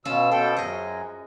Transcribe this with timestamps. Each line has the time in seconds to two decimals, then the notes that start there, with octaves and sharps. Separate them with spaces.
0.05 B2 C#4 F4 E6
0.31 B2 A4 C5 G5
0.57 F#2 G#4 D#5